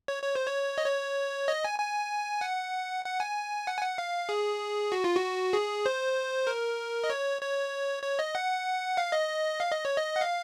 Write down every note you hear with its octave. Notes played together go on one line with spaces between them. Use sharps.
C#5
C#5
C5
C#5
D#5
C#5
D#5
G#5
G#5
F#5
F#5
G#5
F#5
G#5
F#5
F5
G#4
F#4
F4
F#4
G#4
C5
A#4
D#5
C#5
C#5
C#5
D#5
F#5
F5
D#5
F5
D#5
C#5
D#5
F#5
F5